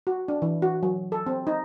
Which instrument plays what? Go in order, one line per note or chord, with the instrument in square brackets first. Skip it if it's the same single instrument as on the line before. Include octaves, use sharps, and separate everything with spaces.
[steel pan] F#4
D4
E3
F#4
F#3
A4
C4
D#4